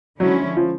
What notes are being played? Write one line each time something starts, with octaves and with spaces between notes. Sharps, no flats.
D3 F3 F#3 G#3 C#4 E4
F3